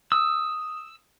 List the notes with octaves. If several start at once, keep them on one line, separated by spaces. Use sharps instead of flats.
D#6 E6